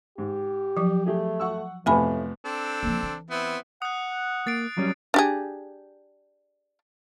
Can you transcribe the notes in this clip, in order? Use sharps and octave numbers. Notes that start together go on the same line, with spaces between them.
G#2 G4
F3 F#3
A3 G4 G#4
F#5 C#6 E6
F2 A2 C3 A3 B3 E5 G#5 B5
C4 D4 A4
F3 A#3
E3
B3 C4 E4
F#5 D#6 F#6
A#3 A6 C7 D7
F#3 G3 C#4
D4 G4 G#4